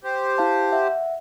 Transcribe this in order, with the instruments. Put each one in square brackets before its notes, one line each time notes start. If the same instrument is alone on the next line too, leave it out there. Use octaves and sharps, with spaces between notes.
[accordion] G4 C5
[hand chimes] E4 F5 A5
E5 F#5